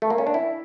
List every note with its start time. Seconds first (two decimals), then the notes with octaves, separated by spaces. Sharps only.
0.02 A3
0.10 A#3
0.18 C#4
0.27 D4
0.34 E4